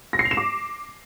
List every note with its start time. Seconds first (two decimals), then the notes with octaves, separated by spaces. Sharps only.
0.13 A#6
0.19 C7
0.25 F7
0.31 E7
0.37 D6